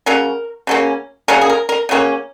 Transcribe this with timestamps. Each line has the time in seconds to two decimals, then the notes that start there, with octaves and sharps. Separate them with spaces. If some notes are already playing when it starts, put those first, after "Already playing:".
0.06 C#3 F#3 A#3 C#4 A#4
0.67 C#3 F#3 A#3 C#4
1.28 C#3 F#3 A#3 C#4 A#4
1.41 G#4
1.50 A#4
1.69 A#4
1.89 C#3 F#3 A#3 C#4